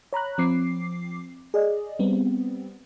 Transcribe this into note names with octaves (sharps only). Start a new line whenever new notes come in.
C#5 A#5 B5 F#6
F3 C4 D6 C7
G#4 D5 D#5
G3 B3 C4